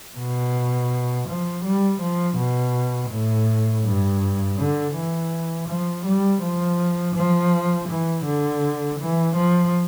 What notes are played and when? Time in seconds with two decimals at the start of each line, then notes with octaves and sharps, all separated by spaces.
0.18 B2
1.28 F3
1.64 G3
2.00 F3
2.37 B2
3.11 A2
3.84 G2
4.58 D3
4.95 E3
5.68 F3
6.05 G3
6.42 F3
7.15 F3
7.88 E3
8.25 D3
8.99 E3
9.35 F3